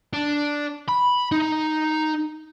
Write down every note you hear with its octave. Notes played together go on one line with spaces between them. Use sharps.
D4
B5
D#4